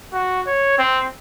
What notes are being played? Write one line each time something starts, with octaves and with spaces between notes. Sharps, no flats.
F#4
C#5
C4